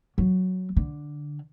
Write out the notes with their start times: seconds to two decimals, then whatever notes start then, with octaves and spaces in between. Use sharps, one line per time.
0.18 F#3
0.77 D3